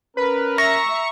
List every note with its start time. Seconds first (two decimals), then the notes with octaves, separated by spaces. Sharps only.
0.17 C#4 A#4 B4
0.58 E5 A#5 C#6 A#6